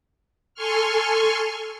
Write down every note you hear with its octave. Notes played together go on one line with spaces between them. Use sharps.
A4 G#5 C6 C#6 F6